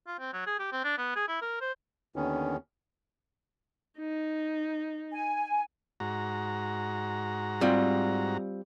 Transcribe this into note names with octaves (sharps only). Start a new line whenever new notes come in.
F4
C4
F#3
G#4
G4
C4
D4
B3
G#4
E4
A#4
C5
D#2 D3 D#3 B3 C#4
D#4
G#5
G#2 F#4 A#5
G3 C4 F4